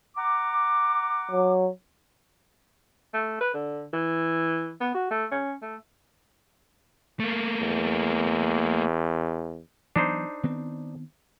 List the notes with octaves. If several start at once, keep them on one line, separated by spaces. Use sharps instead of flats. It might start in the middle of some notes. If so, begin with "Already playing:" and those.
F#5 A#5 D6
F#3
A3
B4
D3
E3
B3
F#4
A3
C#4
A3
A3 A#3
E2
E3 F#3 B3 D4 D#4 C5
D#3 B3 C4